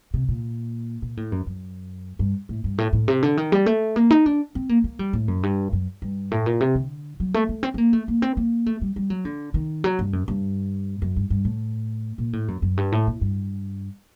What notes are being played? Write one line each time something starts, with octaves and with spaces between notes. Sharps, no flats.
C3
A#2
A#2
A2
F#2
F#2
G2
A2
G2
A2
A2
C3
D3
D#3
G3
A3
A#3
D#4
D4
C4
A#3
A#3
G3
A2
F#2
G2
F#2
G2
A2
A#2
C3
D3
F#3
A3
A3
C4
C4
A#3
A3
A#3
C4
A#3
A3
G3
G3
F#3
D3
D#3
F#3
G2
F#2
G2
F#2
G2
G2
A2
A#2
A2
F#2
F#2
G2
A2
A#2
G2